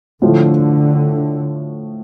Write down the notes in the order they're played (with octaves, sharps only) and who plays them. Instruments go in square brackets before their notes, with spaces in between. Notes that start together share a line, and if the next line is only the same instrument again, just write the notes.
[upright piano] A2 F3 A3 F4 [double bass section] D3